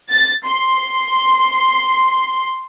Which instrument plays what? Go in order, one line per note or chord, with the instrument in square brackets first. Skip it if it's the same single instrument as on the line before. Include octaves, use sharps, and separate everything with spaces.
[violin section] A6
C6